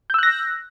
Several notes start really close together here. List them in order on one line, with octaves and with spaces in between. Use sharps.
G6 E6 F#6 A#6